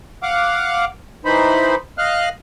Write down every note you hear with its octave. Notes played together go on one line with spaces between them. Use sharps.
F5 F#5 D6
E3 D#4 C5 B5
D#5 F5 F6 F#6